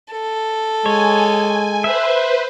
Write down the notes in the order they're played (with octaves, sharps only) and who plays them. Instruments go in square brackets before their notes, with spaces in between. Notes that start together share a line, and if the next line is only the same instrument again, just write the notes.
[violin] A4
[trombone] G#3 [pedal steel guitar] C#5 [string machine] G#5
[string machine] B4 C5 [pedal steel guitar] E5